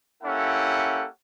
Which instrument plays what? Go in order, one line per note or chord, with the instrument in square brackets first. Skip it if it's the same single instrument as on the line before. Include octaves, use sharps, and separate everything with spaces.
[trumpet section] A#3 C#4 E4 G4 A4 F#5